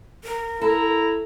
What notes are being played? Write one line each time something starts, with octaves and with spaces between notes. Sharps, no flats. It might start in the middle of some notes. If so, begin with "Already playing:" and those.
A#4
E4 A4 A#5